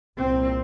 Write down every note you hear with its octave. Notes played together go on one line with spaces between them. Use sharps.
C2 A#2 C4